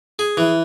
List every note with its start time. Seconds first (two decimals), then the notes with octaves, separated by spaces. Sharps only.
0.19 G#4
0.37 E3